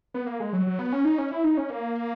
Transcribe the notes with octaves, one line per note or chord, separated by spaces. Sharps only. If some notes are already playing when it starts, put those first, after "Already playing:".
B3
A#3
G#3
F#3
F#3
B3
C#4
D#4
C#4
E4
D#4
C#4
A#3